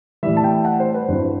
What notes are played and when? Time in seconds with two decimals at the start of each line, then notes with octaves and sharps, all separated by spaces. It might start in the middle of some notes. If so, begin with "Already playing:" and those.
0.23 A2 E3 G3 E5
0.37 A5
0.44 G5
0.65 F#5
0.80 C5
0.94 B4
1.08 G2 F#3 C4 E4 C5